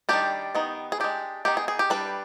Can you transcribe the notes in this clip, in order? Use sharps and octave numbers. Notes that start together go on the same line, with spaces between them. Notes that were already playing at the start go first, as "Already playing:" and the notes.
D#3 G3 D4 G4
D#3 B3 D#4
G#4
G#3 D4 G4
D#3 B3 D#4 G4
G#4
G#4
G4
G3 D4 B4